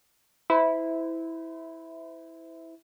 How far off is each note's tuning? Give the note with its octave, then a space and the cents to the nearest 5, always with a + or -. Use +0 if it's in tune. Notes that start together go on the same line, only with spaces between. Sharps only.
E4 -10 C5 -40